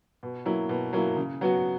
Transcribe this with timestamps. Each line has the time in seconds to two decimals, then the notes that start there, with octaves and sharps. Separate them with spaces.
0.23 B2
0.45 F#3 A#3 E4
0.69 B2
0.93 F#3 A#3 E4
1.17 C#3
1.41 F#3 B3 F#4